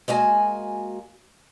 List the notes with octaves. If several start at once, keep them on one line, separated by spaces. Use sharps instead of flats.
G#3 A#3 F#4 G#5